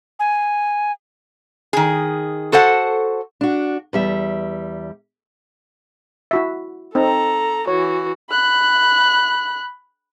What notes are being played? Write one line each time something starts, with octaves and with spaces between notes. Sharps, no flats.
G#5
D#3 G#4
F#4 A4 C5 F#5
D4 F#4
E2 G3 E5
E4 F#4 E5
C4 D#4 A4 A#5
E3 F#4 C#5
B5 F#6